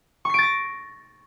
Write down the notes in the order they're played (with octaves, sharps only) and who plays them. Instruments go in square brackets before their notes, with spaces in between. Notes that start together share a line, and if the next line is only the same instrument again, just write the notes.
[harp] C#6
C7
D7
A6
A#6